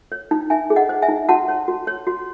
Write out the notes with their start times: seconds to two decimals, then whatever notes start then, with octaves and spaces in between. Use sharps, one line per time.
0.12 C#5
0.31 D#4
0.50 D#4 E5 G#5
0.70 G#4
0.76 D#5 F#5
0.89 C5
1.02 E5 G#5
1.08 D#4
1.29 F#4 F#5 A5
1.48 C#5
1.68 F#4
1.87 C#5
2.07 F#4